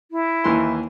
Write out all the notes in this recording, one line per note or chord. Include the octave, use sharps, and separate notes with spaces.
E4
D#2 E3 C6